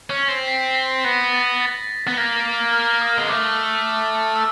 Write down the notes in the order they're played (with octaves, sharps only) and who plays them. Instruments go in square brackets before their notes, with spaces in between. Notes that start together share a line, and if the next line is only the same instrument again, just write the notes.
[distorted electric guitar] C#4
C4
[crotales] B6
B6
[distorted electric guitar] B3 [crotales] A#6
[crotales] A6
A6
[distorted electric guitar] B3
A#3
[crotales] F6
D#6
[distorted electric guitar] G#3
[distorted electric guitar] A3 [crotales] D6
[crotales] E6